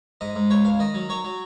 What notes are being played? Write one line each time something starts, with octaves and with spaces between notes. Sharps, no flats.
G#2 D#5
G#2
C#2 C#5
C#2 F5
D#3 D#5
F#3
F#3 C#5
F#3